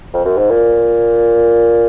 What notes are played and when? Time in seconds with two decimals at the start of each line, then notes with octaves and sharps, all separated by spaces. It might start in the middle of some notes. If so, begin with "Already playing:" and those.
0.14 F2
0.25 F#2
0.38 G#2
0.50 A#2